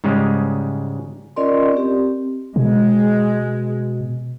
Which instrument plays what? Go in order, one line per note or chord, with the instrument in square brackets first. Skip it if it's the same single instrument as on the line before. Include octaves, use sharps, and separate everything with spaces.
[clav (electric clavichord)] G#2 C#3 G3 G#3
[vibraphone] C#4 F4 A#4 D5 D#5 C6
C4 G4
[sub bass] B2 [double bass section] G#3